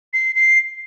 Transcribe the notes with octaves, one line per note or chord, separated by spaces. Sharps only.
C7
C7